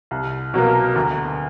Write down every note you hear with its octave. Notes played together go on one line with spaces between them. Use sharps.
C2
B2 F#3 A#3
D2